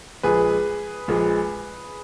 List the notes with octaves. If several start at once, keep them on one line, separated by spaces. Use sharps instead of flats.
A#1 A#2 G#3 G#4 B4
A#1 A#2 G#3